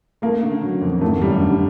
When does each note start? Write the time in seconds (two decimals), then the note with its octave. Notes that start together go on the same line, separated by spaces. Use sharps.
0.22 A3 A#3
0.43 D3
0.62 F#3
0.82 F2
1.01 G#1 A3
1.21 F#2 G3
1.41 D3